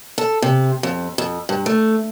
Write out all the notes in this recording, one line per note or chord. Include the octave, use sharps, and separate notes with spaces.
A4
C3
F2
F2
G2
A3